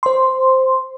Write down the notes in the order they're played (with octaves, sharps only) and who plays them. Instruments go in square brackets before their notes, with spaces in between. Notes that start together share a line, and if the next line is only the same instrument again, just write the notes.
[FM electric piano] C5 C6